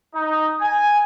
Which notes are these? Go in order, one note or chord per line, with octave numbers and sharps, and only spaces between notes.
D#4
G#5